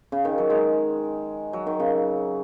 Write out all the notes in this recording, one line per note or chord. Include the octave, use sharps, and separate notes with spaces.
C#3
D#3
F#3
G#3
F#3
D#3
C#3